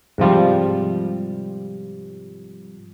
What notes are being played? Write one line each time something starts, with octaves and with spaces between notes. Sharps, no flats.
G#2 C3 F3 G3